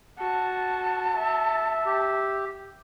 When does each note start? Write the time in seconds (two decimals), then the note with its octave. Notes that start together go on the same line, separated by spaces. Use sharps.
0.19 F#4 A5
1.17 E5
1.86 G4